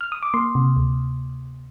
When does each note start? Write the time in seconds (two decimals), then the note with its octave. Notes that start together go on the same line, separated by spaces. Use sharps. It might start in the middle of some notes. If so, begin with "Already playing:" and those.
0.01 F6
0.12 D#6
0.23 D6
0.34 A#3 C6
0.55 C3
0.77 D2